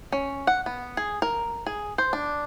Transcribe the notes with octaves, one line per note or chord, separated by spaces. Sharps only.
C#4
F#5
B3
G#4
A#4
G#4
C5
D4